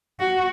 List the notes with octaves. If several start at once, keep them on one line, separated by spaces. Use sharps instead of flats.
F#4